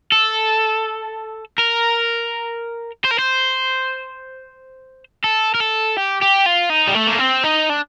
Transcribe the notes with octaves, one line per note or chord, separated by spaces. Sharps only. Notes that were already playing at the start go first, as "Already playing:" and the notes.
A4
A#4
C5
A#4
C5
A4
A#4
A4
G4
G4
F4
D#4
G3
A3
A#3
C4
D#4
D4